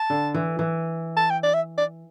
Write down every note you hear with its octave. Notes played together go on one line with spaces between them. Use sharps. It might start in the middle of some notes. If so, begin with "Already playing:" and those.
Already playing: A5
D3
E3
E3
A5
G5
D5
E5
D5